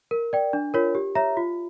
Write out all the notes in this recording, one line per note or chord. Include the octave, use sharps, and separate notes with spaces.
A#4
D5 G5
D4
F4 A#4 C#5
G4
C#5 E5 A#5
F4